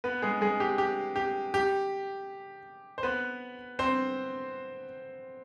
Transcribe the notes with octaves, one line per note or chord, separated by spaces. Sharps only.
B3 B4
G#3 G#4
G#3 G#4
G4
G4
G4
G4
C5
B3 B4
C4 C5